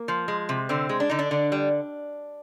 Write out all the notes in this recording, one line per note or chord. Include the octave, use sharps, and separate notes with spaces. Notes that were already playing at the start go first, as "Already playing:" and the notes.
Already playing: A#3
F3
G#3
C3
D3 C4
G#3
D4
D3 D#4
D4
D3
G3